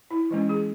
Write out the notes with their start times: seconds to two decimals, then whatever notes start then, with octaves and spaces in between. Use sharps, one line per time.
0.11 E4
0.30 E3 G#3 C#4
0.49 G#4